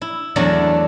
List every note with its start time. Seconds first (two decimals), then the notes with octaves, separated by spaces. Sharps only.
0.02 E4
0.36 E2 F#3 A3 D4 D5